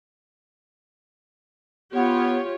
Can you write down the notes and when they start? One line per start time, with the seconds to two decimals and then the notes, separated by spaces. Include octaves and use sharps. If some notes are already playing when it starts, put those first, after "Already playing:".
1.94 B3 F4 G4 C#5